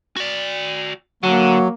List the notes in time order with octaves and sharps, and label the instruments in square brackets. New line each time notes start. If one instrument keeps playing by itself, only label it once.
[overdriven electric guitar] F#4 D5
[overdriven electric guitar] D3 [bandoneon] F#3 [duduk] A#3 [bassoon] F#4